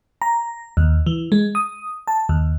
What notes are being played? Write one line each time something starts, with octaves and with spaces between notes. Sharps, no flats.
A#5
D#2
E3
G#3
D#6
A5
D#2